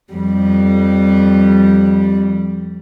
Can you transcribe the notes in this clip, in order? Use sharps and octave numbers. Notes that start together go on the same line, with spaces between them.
F2 G3